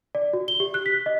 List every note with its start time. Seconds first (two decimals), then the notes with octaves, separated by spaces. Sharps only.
0.15 D5
0.33 F#4
0.48 G7
0.60 G4
0.74 F#6
0.86 B6
1.06 D#5